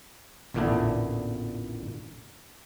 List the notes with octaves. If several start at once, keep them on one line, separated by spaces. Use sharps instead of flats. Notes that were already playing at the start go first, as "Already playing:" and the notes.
A1 E2 A#2 D3 D4 E4